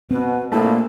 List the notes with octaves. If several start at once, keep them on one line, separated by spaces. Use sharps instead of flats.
B2 C4 B4
A#1 A3 A#3 E4